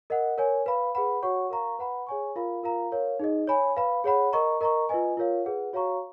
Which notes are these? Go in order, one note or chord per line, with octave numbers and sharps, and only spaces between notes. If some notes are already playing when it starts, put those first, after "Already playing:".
A#4 D#5 F#5
A#4 C#5 G#5
B4 F5 B5
G#4 B4 F#5 B5
F#4 C#5 F#5 C#6
A#4 F5 A#5 C#6
B4 F#5 B5
G#4 C#5 G#5 C#6
F4 A#4 F5 B5
F4 A#4 F5 A#5
A#4 C#5 F5
D#4 G#4 D#5
C#5 G#5 B5
B4 F5 B5
G#4 C#5 F#5 B5
A#4 D#5 A#5 C#6
A#4 D#5 A#5 C#6
F4 B4 D#5 G#5
F4 A#4 C#5 F5
G#4 B4 F#5
F#4 C#5 F5 A#5 C#6